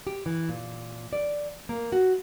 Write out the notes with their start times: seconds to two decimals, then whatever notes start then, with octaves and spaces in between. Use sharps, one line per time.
0.07 G4
0.26 E3
0.49 A#2
1.13 D5
1.69 A#3
1.92 F#4